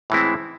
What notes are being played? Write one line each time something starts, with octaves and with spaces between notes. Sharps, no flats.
A2 E3 G#3 C4 E4